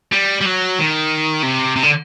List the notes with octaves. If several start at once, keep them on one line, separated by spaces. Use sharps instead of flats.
G3
G3
F#3
D#3
C3
C3
D3